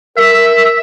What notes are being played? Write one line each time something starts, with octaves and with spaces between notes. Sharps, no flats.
A#4 E5